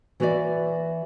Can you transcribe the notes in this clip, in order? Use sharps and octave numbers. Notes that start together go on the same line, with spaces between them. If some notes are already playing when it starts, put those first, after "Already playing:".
E3 F#4 B4 C#5 D5 E5